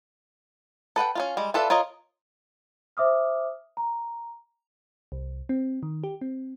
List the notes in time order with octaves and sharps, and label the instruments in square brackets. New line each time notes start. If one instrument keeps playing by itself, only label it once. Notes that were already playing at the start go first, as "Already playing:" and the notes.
[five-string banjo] A4 B4 F#5 G5
C#4 D#4 F4
G3 G#3
F4 A4 B4 D5 E5
F4 A#4 C#5 D#5
[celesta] C5 E5 D6 D#6 F6
A#5
[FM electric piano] C2
C4
D#3
G4
C4